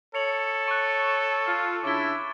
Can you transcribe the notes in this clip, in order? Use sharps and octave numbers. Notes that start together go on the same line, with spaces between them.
A4 C#5 C#7 F7 F#7
C#6 F#6
F4
C#3 D4 E4 D6 A6 G7